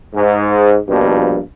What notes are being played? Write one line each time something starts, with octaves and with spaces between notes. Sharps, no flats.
G#2
A#1 G2 B2 F3 A#3